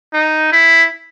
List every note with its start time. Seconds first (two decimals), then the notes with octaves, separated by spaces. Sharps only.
0.14 D#4
0.52 E4